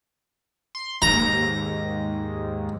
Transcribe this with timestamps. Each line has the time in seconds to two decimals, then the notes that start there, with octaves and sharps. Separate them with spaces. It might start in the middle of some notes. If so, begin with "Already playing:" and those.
0.75 C6
1.02 D#2 G#2 A#5